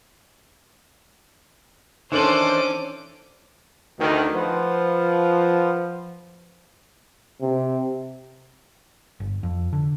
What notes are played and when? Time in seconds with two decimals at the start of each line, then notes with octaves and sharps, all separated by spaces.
2.12 D#3 E3 C#4 D4 A4 C5 D6 F#7
4.00 D2 D#3
4.35 F3 B4 C5 F#5
7.42 C3
9.20 G1
9.43 F2
9.73 D3